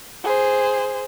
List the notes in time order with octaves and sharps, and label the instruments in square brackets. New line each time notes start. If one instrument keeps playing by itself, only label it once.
[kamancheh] G#4 C5